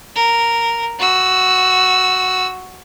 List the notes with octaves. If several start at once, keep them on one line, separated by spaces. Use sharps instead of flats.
A#4
F#4 E6